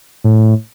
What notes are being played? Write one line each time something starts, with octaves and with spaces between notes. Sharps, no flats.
A2